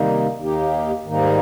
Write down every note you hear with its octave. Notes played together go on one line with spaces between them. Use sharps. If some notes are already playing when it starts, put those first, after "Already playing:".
Already playing: C3 D#3 G3 A#3 D#4
D#2 D#3 A#3 D#4 G4
G#2 D#3 G3 A#3 D#4